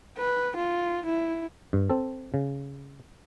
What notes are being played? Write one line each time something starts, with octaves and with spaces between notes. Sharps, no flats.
B4
F4
E4
G2
C4 A4
C#3